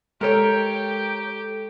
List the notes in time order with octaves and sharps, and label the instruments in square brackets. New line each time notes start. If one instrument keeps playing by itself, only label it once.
[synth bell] G#3 A4 [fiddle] G4 G5 [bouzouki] A#4 C#5